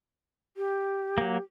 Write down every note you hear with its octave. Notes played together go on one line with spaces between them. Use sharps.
G4
F#3 A#3